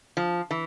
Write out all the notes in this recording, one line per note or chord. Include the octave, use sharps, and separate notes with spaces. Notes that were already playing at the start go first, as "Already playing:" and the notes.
F3
E3